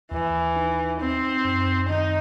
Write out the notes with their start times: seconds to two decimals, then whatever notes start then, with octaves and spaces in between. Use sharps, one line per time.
0.12 D#2 E3
0.56 D#4
1.00 C4 D#4
1.45 F#2
1.89 D#3 D#4